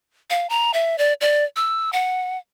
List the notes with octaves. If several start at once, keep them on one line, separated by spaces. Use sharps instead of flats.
F5
A#5
E5
D5
D5
E6
F#5